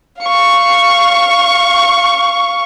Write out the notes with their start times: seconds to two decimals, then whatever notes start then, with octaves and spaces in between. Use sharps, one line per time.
0.21 F5 C#6